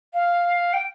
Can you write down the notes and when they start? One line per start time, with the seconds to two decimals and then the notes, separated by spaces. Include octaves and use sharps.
0.13 F5
0.73 G5